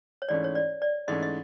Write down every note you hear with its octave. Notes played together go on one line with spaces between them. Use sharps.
C#5
G#2 E3 A3 C#4 D5
C#5
D5
D5
G#2 E3 A3 C#4 D#5
D#5